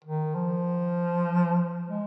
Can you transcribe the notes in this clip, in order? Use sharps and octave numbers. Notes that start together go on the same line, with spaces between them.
D#3
F3
G#3